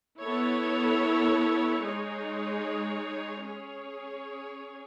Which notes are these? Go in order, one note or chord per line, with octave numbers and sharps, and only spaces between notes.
B3 E4 A4 C#5
G#3 D#4 G#4 C#5
C#4 G#4 C#5